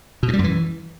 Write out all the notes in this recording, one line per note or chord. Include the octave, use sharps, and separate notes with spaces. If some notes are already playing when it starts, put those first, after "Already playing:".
B2
G2
G3
F#2
E3